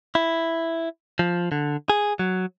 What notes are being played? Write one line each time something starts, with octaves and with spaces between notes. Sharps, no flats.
E4
F3
D3
G#4
F#3